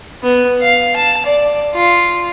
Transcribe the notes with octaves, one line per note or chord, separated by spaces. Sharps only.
B3
F5
A5
D5
F4